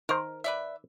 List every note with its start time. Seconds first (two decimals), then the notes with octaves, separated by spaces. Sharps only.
0.09 D#3 A#4 C5
0.44 B4 D5 E5